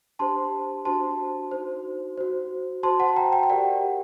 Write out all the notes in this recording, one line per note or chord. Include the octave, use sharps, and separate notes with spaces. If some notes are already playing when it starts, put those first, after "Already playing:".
D4 G4 C5 A5 C6
D4 F#4 C5 A5 C6
D#4 F#4 C5
F#4 C5
F#4 C5 A5 C6
F#5 A5
G5 A#5
G5
G5
G4 A#4 D5 F#5